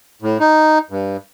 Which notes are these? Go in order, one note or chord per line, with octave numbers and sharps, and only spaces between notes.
A2
D#4
G2